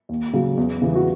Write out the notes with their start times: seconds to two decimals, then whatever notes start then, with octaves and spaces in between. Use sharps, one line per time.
0.09 D#2
0.33 C#3 F#3
0.57 E2
0.82 C#3 E3 G3
0.95 F#4